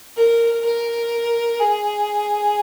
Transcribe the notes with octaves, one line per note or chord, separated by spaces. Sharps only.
A#4
A#4
G#4